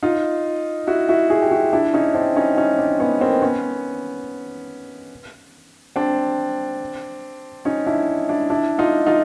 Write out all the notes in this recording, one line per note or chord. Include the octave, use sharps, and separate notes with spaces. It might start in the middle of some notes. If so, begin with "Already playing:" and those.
D#4 F4
E4 F#4
E4 F#4
F#4 G#4
G4
E4 F#4
D4 E4
C#4 D#4
C4 D4
C#4 D#4
C#4 D#4
C4 D4
B3 C#4
A#3 C4
B3 C#4
C4 D4
C#4 D#4
D4 E4
D4 E4
D4 E4
D#4 F4
D#4 F4